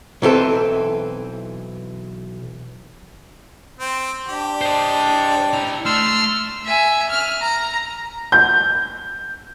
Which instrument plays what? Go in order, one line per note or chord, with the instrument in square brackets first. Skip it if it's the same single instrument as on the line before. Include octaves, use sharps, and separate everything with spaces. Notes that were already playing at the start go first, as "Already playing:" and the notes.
[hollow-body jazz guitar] B1 E3 C4 A4
[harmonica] C4
[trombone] D4 [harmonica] G4
[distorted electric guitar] C5 D#5
E4 A#5
[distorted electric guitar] A3 A5 [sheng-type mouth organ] C6 E6 F6
[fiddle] E5 G#5
F6
A#5
[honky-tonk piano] G6